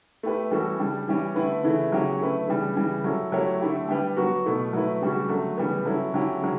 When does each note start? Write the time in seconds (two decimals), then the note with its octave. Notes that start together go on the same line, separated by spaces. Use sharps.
0.23 A3 E4 G4 B4
0.51 E3 G3 C#4 F#4 A4
0.79 C#3 G3 D4
1.08 E3 G3 C#4 G4
1.35 D3 A3 E4 B4
1.64 C#3 E3 A3 E4
1.92 C#3 F#3 C#4 G4
2.20 D3 A3 E4 B4
2.48 C#3 E3 G3 D4
2.76 C#3 E3 G3
3.04 F#3 C#4 E4 A4
3.32 F#3 A3 E4 G4 C#5
3.61 D3 A3 E4 G4
3.88 G3 D4 G4 B4
4.17 F#3 B3 F#4
4.45 B2 A3 E4
4.73 F#3 A3 E4 B4
5.02 C#3 G3 D4 F#4
5.29 D3 F#3 A3
5.58 C#3 E3 G3 B3
5.86 F#3 C#4 E4 A4
6.14 D3 F#3 C#4 E4 G4
6.42 C#3 F#3